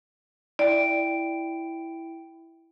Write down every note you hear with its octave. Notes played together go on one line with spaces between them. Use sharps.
E4 D5 G5 D7